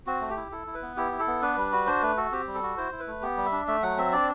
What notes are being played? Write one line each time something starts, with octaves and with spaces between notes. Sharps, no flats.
C4 F#4
A3
G4
E4
E4 A4
E4
B4
B3
E4 G4
E4
A4
B3
D4 B4
G3
F#4
D4 C5
A3 B4
F#4 A4
C4 G4
G3
A4
F#4
E4 C5
E4
B4
A3
B3 G4
G3
E5
D4
A3 E5
F#3 F#5
C4 E5
D4 D5